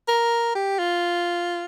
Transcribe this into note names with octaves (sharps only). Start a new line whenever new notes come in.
A#4
G4
F4